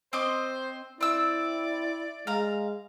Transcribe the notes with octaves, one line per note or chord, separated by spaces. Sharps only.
C4 C5 D#5 D6
C4 E4 D5 E6
G#3 F5 A#5